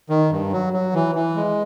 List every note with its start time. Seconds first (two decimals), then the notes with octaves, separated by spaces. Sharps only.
0.10 D#3
0.31 G2
0.52 F#3
0.73 F#3
0.94 E3
1.15 E3
1.36 G#3